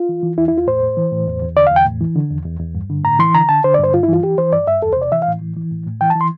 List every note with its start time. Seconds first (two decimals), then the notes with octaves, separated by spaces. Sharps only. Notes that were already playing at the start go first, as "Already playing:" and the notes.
Already playing: F4
0.09 E3
0.23 E3
0.38 E2 E4
0.48 E4
0.53 E2 F4
0.67 A2 C5
0.83 A2
0.97 E3
1.12 A2
1.27 E2
1.42 E2
1.56 D3 D5
1.67 F5
1.72 E2 G5
1.86 A2
2.01 E3
2.16 D3
2.31 E2
2.45 E2
2.60 E2
2.75 G2
2.90 D3
3.04 A2 A#5
3.19 E3 C6
3.34 D3 A#5
3.49 D3 A5
3.64 D3 C5
3.74 D5
3.79 G2 C5
3.93 G2 F4
4.03 E4
4.08 E3 F4
4.23 E3 G4
4.38 E3 C5
4.53 G2 D5
4.67 G2 E5
4.82 E2 A4
4.93 C5
4.97 C3
5.02 D5
5.12 E3 E5
5.22 F5
5.27 A2
5.41 E3
5.56 E3
5.71 A2
5.86 A2
6.01 E3 G5
6.10 A5
6.16 E3 C6